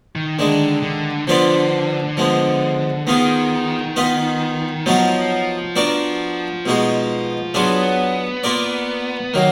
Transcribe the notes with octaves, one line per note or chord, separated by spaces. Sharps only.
D#3
D3 D#3 G#3 D4
D3
D3 F3 B3 F4 B4 D5
F3 G#3 B3
D#3 B3 F4 G#4
B3 F4 B4 D#5
F3 F#3 B3 D#4 F#4
B3 D4 F#4 A#4 D5
B2 G#3 D#4 F#4
F#3 B3 D4 F4 G#4
A#3 F4 A#4 D5
D#3 F#3 A#3